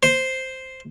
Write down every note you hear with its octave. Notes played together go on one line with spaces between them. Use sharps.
C5